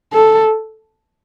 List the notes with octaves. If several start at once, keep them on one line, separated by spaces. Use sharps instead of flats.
A4